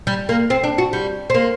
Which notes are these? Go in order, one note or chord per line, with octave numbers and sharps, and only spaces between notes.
G3
A#3
C4
D4
F#4
G3
C4
A#3